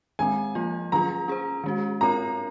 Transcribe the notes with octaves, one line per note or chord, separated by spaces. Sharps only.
D#3 G#3 C4 G#5
F3 A#3 F4
D#3 F#3 C#4 F4 G#4 A#5
C#4 G#4 C5
D#3 G#3 C#4 F#4
C4 F4 A#4 C#5 A#5